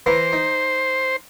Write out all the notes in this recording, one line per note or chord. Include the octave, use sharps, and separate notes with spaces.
E3 B4 C5 A#5
D#4